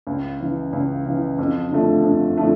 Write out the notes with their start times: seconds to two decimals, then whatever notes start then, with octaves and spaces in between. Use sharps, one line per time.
0.07 C#2
0.40 C#3 E3
0.73 C#2
1.06 C#3 E3
1.38 F2
1.71 D3 F3 A3
2.04 F2
2.37 D3 F3 A3